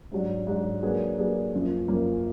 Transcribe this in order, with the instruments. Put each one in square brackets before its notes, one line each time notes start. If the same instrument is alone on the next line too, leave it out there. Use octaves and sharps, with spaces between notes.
[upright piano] G#2 F#3 D4
G#2 F#3 D4
F#3 A#3 D4 G#4 B4
F#3 A#3 D4 G#4 B4
F#2 F3 A#3
F#2 F3 A#3